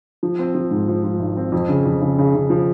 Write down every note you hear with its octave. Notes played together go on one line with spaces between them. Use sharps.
F3
C4
F3
G#2
F3
F3
G#1
C4
F2
C#3
F2
C#3
C#3
C#3
F3